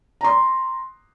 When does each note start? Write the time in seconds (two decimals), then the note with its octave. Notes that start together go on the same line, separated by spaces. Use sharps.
0.21 A#5 C6